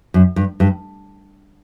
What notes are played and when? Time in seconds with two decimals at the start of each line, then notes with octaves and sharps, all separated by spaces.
0.14 F#2
0.36 G2
0.60 G2